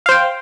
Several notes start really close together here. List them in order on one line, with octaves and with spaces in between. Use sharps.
F5 C5 G5